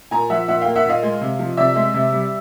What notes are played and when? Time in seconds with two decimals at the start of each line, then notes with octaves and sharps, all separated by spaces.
0.11 A#2 G#5 A#5
0.30 F3 E5 F#5
0.48 A#2 E5 F#5
0.62 A#3 F5 G5
0.76 E5 F#5
0.85 A#2 D#5 F5
1.03 G#3
1.21 C3
1.39 F3
1.57 C3 D5 E5
1.76 G#3
1.94 C3
2.13 G3